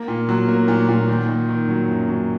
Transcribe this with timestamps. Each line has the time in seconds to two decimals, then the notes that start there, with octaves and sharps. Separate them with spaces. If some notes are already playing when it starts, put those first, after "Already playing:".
Already playing: A#3
0.08 A#2
0.29 F#3
0.48 A#3
0.68 A#2
0.89 A#2
1.08 D#3
1.28 D#3
1.49 D#3
1.69 F#3
1.88 F#2
2.09 F#3